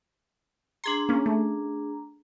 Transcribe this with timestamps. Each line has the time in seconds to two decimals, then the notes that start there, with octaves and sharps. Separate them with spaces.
0.84 D4 G#4 A#5 C6 G#6
1.09 A#3 C#4
1.26 A3